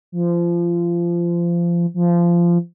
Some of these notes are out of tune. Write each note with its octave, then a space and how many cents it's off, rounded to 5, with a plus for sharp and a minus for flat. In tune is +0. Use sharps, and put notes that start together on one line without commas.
F3 -25
F3 -20